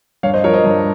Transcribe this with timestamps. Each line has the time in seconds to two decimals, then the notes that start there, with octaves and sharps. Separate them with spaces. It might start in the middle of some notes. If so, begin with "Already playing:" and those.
0.23 G2 C#5 F5
0.34 C5 D#5
0.44 F3 A#4 C#5
0.54 C5 D#5
0.64 G2